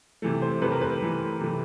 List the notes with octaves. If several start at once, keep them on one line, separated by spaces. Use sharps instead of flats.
C3 E3 A3
C5
C3 E3 A3 B4
A#4
B4
C3 E3 A3
C3 E3 A3